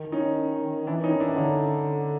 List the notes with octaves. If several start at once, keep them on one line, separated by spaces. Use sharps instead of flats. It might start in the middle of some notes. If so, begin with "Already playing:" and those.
Already playing: D#3
C#4 D#4
E3 D4 E4
C#4 D#4
D#3
D4 E4
D3 C#4 D#4